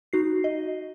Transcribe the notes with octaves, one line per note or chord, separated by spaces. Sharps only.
D#4 F#4 C7
D#5